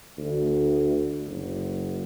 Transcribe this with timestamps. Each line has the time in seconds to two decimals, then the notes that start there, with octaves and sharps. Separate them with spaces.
0.18 D2
1.27 F#1